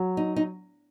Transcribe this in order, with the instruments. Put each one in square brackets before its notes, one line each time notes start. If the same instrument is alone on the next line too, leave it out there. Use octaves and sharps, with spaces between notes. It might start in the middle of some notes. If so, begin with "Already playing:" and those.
Already playing: [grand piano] F#3
[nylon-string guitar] D#4
D#4